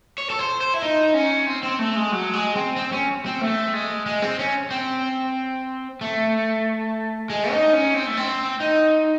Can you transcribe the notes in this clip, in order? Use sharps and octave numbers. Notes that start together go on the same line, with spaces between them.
C#5
A4
C5
C5
E4
D#4
C#4
C4
C4
A3
G#3
F#3
G#3
C4
C4
C#4
C4
A3
G#3
G#3
C4
C#4
C4
A3
G#3
D#4
C#4
C4
A3
C4
D#4